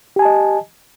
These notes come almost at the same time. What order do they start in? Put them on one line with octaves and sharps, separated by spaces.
G4 G#5 A5 D#5